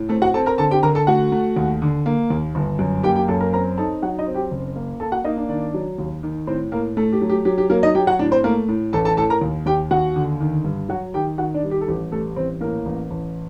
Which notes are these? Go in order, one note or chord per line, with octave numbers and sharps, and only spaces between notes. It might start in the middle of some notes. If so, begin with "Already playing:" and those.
Already playing: A2
A3 C4 A4
F#4 F#5
C4 A4 A5
A#4 A#5
D3 A4 A5
G4 G5
D3 A#4 A#5
A4 A5
A3 F#4 F#5
A3
D#2
D3
A#3
D#2
G1
F#2
A#3 G4 G5
G4 G5
F#2 A4 A5
A#4 A#5
C4 A#4 A#5
D#4 A4 A5
F#3 F#4 F#5
D#4 D#5
C4
G4 G5
F#1
A#3
A#3 A4 A5
F#4 F#5
A#3 D#4 D#5
D4 D5
D#3 D4 D5
F#3
D#2
D#3
A2 C4 C5
A2 A#3 A#4
A3 A4
G4
F#3
G4
F#3 G4
G4
F#3 A#3 A#4
D#4 D#5
F#3 G4 G5
F#4 F#5
A2 D4 D5
C4 C5
A3 A#3 A#4
A2
A1 A4 A5
A4 A5
A2 A4 A5
A#4 A#5
D#2
D#2 G4 G5
D#2 F#4 F#5
D3
D#3
G2
F#3 F#4 F#5
D#3 G4 G5
D#3 F#4 F#5
D4 D5
G3
G4
A4
A1 G4
G3 A3 A4
A1 C4 C5
A2 A#3 A#4
A1
A1